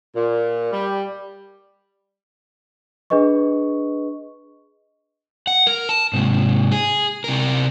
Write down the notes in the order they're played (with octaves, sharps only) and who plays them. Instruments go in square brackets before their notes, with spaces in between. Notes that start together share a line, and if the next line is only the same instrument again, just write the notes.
[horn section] A#2
G3
[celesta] D4 G#4 B4 D#5 C#6
[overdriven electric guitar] F#5
A#4
A5
G#2 C3
G#4
C3 A#4